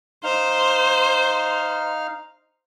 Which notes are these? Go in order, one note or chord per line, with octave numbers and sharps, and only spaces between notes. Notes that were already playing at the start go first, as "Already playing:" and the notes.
D#4 C5 F5 F6